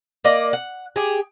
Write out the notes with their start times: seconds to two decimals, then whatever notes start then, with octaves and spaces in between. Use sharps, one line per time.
0.24 A#3 D5 D#5
0.53 F#5
0.96 G4 G#4